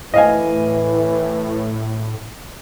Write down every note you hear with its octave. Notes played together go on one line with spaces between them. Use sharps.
A2 E3 D#5 F5 G#5